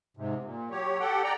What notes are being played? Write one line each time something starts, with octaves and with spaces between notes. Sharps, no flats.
G#2 C3
A#2
F#3 G4 C#5
G4 A4 F#5 G5
D5 G5 A#5